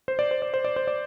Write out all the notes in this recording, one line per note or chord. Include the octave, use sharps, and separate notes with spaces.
C5
D5
C5
D5
C5
D5
C5
D5